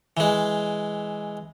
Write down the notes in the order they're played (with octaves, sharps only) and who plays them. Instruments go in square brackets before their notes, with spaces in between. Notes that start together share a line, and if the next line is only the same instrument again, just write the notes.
[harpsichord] E3 G#3